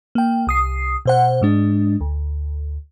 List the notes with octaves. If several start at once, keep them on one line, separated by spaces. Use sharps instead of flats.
A#3 G5
C2 D#6 C7
B2 C5 F#5
G#2 G#3 D4
D2